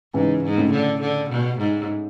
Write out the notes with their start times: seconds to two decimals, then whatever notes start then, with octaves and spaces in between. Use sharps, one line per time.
0.14 G#2 C#3 E3
0.43 G#2
0.58 A2 C#3
0.72 D3
1.01 D3
1.30 B2
1.58 G#2